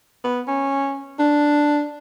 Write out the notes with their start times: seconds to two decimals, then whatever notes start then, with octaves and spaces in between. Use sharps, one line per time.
0.24 B3
0.48 C#4
1.19 D4